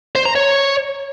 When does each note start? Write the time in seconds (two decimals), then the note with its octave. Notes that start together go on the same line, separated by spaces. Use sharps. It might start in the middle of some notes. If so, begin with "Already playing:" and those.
0.15 C5
0.25 A#5
0.35 C#5